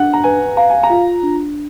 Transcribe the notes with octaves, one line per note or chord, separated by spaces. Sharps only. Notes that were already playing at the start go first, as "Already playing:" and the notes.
Already playing: D4 F#5
A#5
B4 G#5
F5 A#5
G#5
A#5
F4
D4